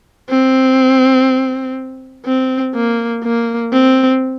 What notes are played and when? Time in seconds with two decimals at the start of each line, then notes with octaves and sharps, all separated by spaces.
0.30 C4
2.26 C4
2.75 A#3
3.24 A#3
3.73 C4